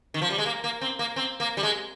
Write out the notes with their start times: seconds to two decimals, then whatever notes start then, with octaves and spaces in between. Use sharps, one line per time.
0.14 D#3
0.22 F3
0.30 G3
0.38 G#3
0.46 A#3
0.64 A#3
0.81 C4
0.99 A#3
1.16 C4
1.40 A#3
1.57 G3
1.63 G#3